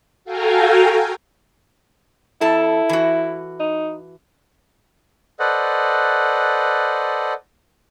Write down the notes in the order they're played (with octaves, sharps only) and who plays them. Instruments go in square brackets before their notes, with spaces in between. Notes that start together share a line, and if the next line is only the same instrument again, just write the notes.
[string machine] F#4 A4 F5 G5 G#5 A#5
[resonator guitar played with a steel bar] F2 A4 A5 [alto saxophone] E4
[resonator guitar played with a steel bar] E3 F#4
[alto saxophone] D#4
[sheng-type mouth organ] A4 B4 C5 D5 D#5 F#5